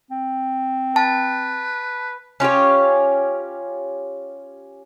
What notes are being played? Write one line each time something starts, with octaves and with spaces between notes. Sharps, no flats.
C4
B4 A5
C#4 F4 G4 C#5